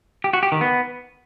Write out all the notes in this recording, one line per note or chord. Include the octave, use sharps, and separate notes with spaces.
G4
F#4
G4
D#3
B3